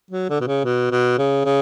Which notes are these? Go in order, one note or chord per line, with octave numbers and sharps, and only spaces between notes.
F#3
D3
B2
C#3
B2
B2
C#3
C#3